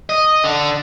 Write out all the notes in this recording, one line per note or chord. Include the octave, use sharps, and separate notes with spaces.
D#5
D3